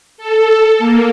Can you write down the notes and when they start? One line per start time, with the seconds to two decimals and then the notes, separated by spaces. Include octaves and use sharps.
0.18 A4
0.78 A#3